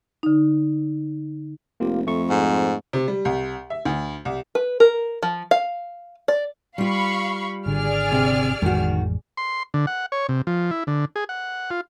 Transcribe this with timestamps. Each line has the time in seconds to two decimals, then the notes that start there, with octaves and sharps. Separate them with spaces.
0.23 D3 D#4
1.80 F1 A#3 F4 G4
2.07 F2 A3 C#6
2.30 G#2
2.93 C3
3.08 G3
3.25 C2
3.70 E5
3.85 D2
4.25 C2
4.55 B4
4.80 A#4
5.23 F3
5.51 F5
6.28 D5
6.78 G3 F4 F5 B5 C#6
7.66 G#1 D3 G#4 D5 F6
8.12 C3
8.62 A1 F2 D#3 G#3 F#4
9.37 C6
9.74 D3
9.87 F#5
10.12 C#5
10.29 C3
10.47 F3
10.71 E4
10.87 D3
11.16 G#4
11.29 F#5
11.71 F4